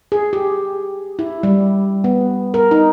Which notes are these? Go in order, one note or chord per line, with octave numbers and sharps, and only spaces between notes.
G#4
G4
E4
G3
B3
A#4
D#4